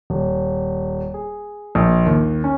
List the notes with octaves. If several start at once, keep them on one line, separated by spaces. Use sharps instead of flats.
D#1
G#4
A#1
D#2
C#4